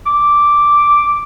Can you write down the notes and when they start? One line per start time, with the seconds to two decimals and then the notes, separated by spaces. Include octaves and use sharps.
0.06 D6